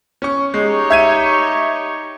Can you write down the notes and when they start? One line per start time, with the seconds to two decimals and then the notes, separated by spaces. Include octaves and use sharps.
0.22 C#4 C#6
0.54 G#3 D#4 G4 C#5
0.90 E5 G#6 D#7